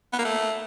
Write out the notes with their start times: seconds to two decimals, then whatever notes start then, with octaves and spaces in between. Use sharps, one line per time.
0.13 B3
0.19 A#3
0.25 A3